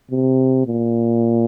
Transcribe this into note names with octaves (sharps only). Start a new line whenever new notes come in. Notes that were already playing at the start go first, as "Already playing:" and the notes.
C3
A#2